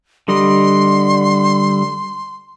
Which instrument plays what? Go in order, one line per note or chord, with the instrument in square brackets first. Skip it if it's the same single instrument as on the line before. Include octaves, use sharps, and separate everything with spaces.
[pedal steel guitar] D3 G3 D#5 [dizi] C6